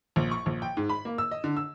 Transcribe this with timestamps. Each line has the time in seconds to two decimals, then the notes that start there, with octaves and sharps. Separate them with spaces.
0.16 A#1
0.31 C#6
0.46 A#1
0.62 G5
0.77 G#2
0.89 B5
1.05 A#3
1.18 E6
1.31 D#5
1.44 D3
1.57 E6